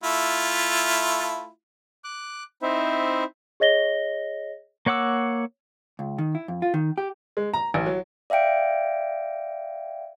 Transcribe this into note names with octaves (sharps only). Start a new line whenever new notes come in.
A3 E4 F4
D6 F#6
C4 D#4 E4 C5 E5
G#4 C#5 D#5 A#6 G7
A#3 C#5 F#5 D6 E6
C#2
D#3
E4
F2
F4
D#3
G4
G#3
A#5
A1
F#3
D5 E5 F5 G5 D7